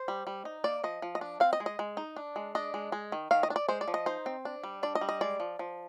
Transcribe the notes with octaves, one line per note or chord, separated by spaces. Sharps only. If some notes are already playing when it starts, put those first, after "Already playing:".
Already playing: C5
G3
G3
D#4
A#3 D5
F3 D#5
F3
D#5
D4
C4 F5
D#5
G#3
D#5
G#3
D#4
D4
G#3
D4 D#5
G#3
G#3
D#3
D#3 F5
D#5
D4
D5
G#3 C5
D5
F3
D#5
D#4 C5
C4
D4
G3
D4 D5
D#5
G3
D#5
G#3 D5
F3
F3